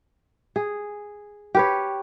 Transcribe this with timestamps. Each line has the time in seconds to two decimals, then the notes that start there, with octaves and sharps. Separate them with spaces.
0.56 G#4
1.55 G4 B4 C#5